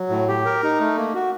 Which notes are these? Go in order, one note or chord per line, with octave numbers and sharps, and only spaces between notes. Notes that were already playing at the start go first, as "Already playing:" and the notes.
Already playing: F#3
A2
G4
A#4
D#4
A3
A#3
F#4